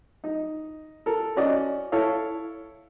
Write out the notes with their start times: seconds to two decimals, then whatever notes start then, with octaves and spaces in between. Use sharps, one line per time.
0.24 D#4
1.06 A4 A#4
1.36 C#4 F#4 D5 D#5
1.92 E4 A4 C#5 F5